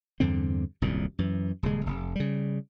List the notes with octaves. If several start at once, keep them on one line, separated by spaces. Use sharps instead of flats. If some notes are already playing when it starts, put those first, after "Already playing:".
E2 G2 D3 C4
D#1 C2 F#2 A#2
F#2 E3
D#1 C#3 G#3
F1
C#3 G3